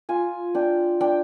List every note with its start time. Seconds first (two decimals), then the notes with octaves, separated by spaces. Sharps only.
0.09 F4 G#5
0.55 D4 G5
1.01 D4 G5